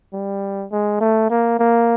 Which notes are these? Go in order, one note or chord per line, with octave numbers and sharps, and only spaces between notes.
G3
G#3
A3
A#3
A#3